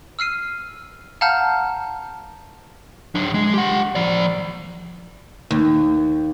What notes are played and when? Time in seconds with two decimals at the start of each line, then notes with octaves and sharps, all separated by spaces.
0.19 E6 F6 C7 D#7
1.21 F5 F#5 A5 A#5 F6 G6
3.15 F#3 D4
3.34 G#3
3.54 G4 F#5
3.95 F3 D5
5.51 D#2